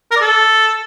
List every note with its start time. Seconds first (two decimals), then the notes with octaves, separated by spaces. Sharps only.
0.11 A#4
0.16 D5
0.21 A4